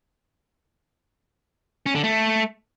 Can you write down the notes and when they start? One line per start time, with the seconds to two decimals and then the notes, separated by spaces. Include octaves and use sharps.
1.86 C#4
1.95 D3
2.04 A3